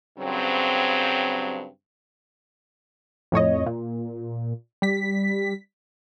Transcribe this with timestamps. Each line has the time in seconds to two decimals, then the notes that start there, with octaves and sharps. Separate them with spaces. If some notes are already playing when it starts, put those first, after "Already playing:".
0.19 G2 C#3 F#3 C4
3.32 F2 A2 C#5 D#5
3.66 A#2
4.82 G3 B6